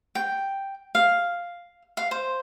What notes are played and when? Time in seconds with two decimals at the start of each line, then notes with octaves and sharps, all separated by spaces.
0.15 G5
0.95 F5
1.97 F5
2.11 C5